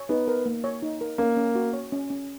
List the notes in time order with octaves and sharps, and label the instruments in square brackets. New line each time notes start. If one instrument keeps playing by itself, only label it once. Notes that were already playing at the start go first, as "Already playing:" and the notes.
Already playing: [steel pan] C#5
[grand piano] B3 [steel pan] D#4
[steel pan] A#4
A#3
C#5
D#4
A#4
[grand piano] A#3 [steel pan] C#4
[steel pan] C#4
F#4
C#5
C#4
C#4